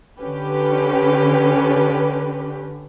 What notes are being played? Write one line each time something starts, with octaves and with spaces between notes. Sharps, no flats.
D3 C#4 G4 B4